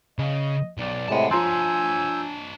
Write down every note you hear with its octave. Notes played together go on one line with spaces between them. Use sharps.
C#3 D#5
B1 D5
A2 C3 G#3 F#5 A5
F3 D4 C#5 G#5 A#5 C6 E6 G6